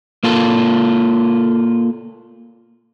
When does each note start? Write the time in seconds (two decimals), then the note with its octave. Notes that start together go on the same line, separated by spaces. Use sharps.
0.23 A#3 F4 A4